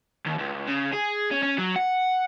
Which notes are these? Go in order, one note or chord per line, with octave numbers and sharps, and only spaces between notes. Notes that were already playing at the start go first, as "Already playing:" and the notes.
D#2
C#2
C#3
G#4
C#4
C#4
F#3
F#5